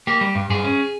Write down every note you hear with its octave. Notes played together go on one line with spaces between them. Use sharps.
A#3 G4
G3
G2
G2 G#4
C#4